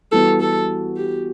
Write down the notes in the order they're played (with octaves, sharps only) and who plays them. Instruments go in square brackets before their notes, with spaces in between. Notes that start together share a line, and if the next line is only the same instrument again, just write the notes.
[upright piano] E3 G3 B3 F#4 [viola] A4
[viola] A4
G4